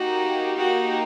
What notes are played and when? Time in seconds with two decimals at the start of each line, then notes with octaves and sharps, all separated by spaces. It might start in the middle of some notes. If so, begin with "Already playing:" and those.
Already playing: A#3 D#4 F#4 G4
0.58 F#4